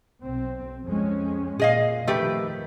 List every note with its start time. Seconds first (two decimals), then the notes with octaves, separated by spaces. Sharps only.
0.23 B1 C4
0.86 F2 G#3 C#4
1.60 A#2 G#4 D#5 F5
2.08 F2 D#3 A3 G4 B4